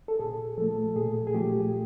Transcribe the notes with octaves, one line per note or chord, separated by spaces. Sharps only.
A4
A#2 G#4
F3 A3 A4
A#2 G#4
G#4
F3 A3 G4